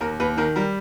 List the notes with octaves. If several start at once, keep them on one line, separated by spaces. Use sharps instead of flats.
D#2 A#4
D#2 B4
D#3 A#4
G3 A#4